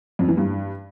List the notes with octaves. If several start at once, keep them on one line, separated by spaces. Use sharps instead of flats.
F2
E3
G2